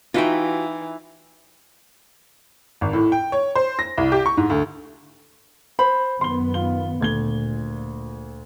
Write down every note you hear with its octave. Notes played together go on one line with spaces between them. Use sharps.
E3 D#4 F4 F#4 E5 G5
G#1
A2
G5
C#5
C5
A#6
C2
G4
C#6
G#2
D2
C5 B5
F#2 D#3 B3 C6 G7
F4 G7
D2 A#2 G#6 G7